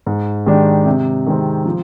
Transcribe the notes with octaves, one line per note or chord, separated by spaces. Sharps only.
G#2
D#3 G#3 D4 G4
C3
D#3 G#3 C4
F3